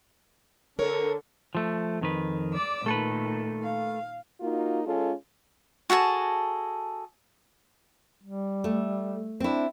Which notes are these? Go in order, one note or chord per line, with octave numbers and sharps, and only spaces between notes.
D3 A4 A#4 C#5
F3 A3
F2 D#3 B4
D5 D6 E6
A#2 D#3 A3 A4 B4
F5
A#3 D#4 F4 F#4
G#3 C#4 F4 A4
F#4 G#4 A4 A5
G3
A3
C4 D4 E4